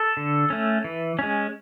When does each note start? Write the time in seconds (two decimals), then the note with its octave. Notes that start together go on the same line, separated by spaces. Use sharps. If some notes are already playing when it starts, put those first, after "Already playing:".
Already playing: A4
0.17 D3
0.50 A3 C#4
0.84 E3
1.19 G#3 C#4